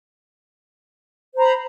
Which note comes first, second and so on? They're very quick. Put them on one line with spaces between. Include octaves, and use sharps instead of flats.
C5 A#5 B5